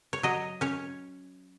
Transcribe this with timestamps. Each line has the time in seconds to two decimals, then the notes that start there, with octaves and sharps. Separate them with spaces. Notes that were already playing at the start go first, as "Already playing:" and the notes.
0.13 C#5
0.23 F#3 D#5
0.61 C#4 C#5